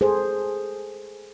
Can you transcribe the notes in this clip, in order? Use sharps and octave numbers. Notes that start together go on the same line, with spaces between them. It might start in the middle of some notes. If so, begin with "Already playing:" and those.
G#4 A4 C5